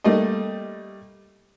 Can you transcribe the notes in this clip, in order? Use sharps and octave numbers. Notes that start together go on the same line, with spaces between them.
G3 A3 A#3 D#5